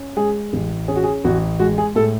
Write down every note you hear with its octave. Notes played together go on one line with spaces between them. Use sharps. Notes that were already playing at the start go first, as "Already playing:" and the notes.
Already playing: C#4
G#3 G#4
A1
C#4 G#4
F#4
G#4
A1 F#4
G#3 F#4
G#4
A2 A4